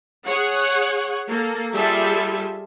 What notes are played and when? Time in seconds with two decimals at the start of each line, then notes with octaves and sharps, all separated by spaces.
0.25 G#4 C#5 F#5
1.27 A#3 A4
1.74 G3 F4 G#4 A4 E5